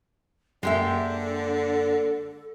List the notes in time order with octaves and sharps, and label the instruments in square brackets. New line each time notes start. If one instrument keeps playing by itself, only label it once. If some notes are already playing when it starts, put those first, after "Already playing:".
[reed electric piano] F#2 A#3 [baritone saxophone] D3 [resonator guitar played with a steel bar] G#3 G4 E5 [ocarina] A4